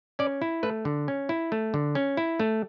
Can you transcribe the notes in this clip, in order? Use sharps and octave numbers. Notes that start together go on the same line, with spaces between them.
C#4 D5
E4
A3 B4
D3
C#4
E4
A3
D3
C#4
E4
A3